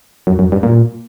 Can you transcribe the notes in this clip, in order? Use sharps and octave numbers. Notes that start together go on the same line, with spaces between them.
F#2
F#2
G2
A#2